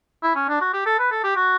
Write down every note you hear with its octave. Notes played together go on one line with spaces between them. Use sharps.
E4
C#4
D4
F#4
G4
A4
B4
A4
G4
F#4